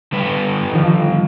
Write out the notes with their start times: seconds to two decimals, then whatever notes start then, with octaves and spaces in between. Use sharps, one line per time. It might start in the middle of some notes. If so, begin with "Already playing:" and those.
0.12 D3 G3 B4
0.72 D#3 F3